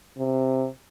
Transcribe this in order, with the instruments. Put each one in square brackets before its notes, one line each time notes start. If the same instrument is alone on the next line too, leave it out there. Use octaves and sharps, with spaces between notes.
[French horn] C3